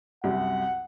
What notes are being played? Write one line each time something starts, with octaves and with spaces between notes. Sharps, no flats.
C2 F#2 F#5